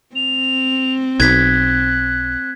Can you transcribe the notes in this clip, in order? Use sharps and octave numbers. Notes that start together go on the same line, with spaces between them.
C4 F7
B1 F#6 G#6 B6